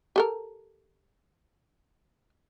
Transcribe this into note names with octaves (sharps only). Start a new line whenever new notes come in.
G4 A4 A#4